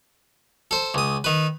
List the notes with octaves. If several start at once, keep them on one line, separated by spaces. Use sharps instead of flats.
A4 C5
C#2 D#6
D#3 B4